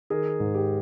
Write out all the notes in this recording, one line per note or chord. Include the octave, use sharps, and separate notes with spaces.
D#3 G#4 A#4
G#2
G4